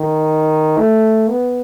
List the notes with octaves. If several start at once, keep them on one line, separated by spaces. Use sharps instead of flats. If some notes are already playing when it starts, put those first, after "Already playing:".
Already playing: D#3
A3
B3